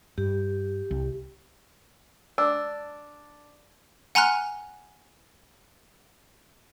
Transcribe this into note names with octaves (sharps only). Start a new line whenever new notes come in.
G2 G4
C2
D4 E6
F#5 G#5 A#5 C6 F6 F#6